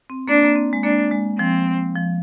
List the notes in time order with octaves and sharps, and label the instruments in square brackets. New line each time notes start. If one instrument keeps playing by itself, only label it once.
[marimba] C4
[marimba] A#3 [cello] D4
[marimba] A#3
C4
G#3
[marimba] A#3 [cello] D4
[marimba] G#3
[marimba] F3 [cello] C4
[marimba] F3